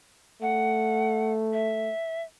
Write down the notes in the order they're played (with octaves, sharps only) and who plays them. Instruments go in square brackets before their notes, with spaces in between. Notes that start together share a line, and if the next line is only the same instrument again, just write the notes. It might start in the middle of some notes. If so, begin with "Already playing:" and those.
[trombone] A3 [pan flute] F#5
[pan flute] E5